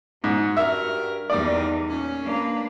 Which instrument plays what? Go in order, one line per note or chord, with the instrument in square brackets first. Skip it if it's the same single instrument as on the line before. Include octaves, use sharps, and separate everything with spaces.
[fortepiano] G#2 [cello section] F#4
[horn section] G2 A#4 [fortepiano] E5
[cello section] E2 D#4 [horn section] D#3 G3 [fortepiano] D5
[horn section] A#2 C#4
[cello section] A#3 D4 B4